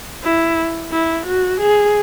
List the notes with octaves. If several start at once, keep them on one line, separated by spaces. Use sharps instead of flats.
E4
E4
F#4
G#4